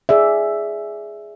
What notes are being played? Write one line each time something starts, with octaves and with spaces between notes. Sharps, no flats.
G#4 D5 E5